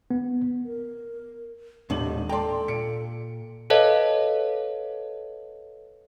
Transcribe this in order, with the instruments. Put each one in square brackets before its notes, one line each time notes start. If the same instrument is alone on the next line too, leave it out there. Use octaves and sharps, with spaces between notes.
[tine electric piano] B3
[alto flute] A#4
[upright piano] D#1 D4 F#7 [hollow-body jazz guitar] D#2 A2 C3 [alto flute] G#3
[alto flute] A4 [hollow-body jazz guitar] D5 A#5 [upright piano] G5 A5 C6
[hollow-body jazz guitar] A#2 [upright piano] C#7 D7
[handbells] A4 B4 C#5 D#5 F5 A5